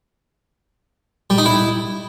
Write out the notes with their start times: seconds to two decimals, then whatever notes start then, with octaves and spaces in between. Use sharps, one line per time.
1.30 G3
1.38 D#4
1.46 E4